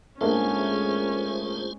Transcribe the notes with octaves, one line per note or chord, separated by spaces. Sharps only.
G#2 A3 A#3 C#4 D4 F4 G#4 C5